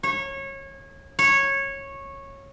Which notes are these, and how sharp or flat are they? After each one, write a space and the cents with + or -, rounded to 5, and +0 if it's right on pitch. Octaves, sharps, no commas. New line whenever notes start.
C#5 -25
C#5 -15